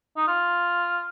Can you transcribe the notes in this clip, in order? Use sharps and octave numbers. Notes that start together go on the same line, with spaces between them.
D#4
F4